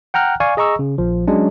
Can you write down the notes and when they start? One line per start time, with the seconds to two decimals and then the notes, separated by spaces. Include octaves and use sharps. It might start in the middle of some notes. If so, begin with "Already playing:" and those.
0.14 F#5 G5 A#5 F6 F#6
0.40 D5 F5 G#5 C#6
0.57 G#4 D#5 A#5 C#6 E6
0.79 C#3
0.98 A#1 F3
1.27 F#3 G#3 C#4 D4